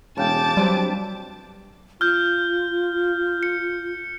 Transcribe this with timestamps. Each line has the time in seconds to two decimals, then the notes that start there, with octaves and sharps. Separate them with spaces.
0.17 E1 C#3 G5 A5 D6
0.57 F#3 G3 C4 D4 B4
2.01 F4 F6 G6
3.43 C#7